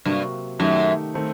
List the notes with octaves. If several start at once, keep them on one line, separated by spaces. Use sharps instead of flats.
G2 C3 F#3 A#3
F#2 D#3 A3 D#4 G4
D#3 A3 C4